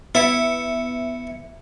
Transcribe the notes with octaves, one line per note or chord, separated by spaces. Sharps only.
B3 E4 E5 C#7